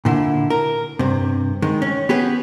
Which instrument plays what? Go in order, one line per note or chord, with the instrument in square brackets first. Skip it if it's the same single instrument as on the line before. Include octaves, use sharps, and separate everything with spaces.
[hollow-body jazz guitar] A#2 D3 E4
A#4
G2 C3
D#3 G#3
C#4
B3 G4 G#4 B4